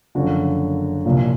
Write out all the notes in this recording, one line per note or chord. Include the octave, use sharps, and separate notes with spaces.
F#1 F#2 D3 F3 F#4
C2 A#2 F3